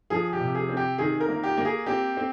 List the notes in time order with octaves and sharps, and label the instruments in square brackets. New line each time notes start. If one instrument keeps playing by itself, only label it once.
[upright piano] F3 G#4
G4
C3
G#4
C4
G4
D#3 G#4
A#4
A#3
G4
A#3
G#4
C4 G4
C4